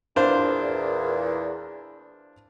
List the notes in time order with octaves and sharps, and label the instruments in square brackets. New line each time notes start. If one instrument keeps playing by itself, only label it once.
[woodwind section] E2 A#2 [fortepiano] D4 C5 F5